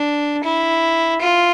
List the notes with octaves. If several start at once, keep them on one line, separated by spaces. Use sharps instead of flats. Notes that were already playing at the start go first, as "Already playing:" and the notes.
Already playing: D4
E4
F4